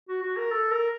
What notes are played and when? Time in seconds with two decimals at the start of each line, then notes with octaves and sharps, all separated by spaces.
0.09 F#4
0.23 F#4
0.37 A#4
0.52 A4
0.71 A#4